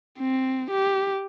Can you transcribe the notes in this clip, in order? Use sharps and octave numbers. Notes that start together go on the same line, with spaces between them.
C4
G4